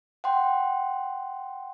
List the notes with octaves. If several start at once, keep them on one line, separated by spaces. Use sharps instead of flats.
F#5 G5 C6